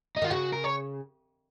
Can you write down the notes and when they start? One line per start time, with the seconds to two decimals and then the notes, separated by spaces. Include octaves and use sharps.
0.16 D#4
0.22 D#3 F4
0.30 C#3 F#4
0.52 A#4
0.64 C#5